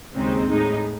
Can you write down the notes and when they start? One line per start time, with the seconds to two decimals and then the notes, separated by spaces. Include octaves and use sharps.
0.14 D#2 C#3 G#3 C4 D#4
0.48 A2 G#3 D#4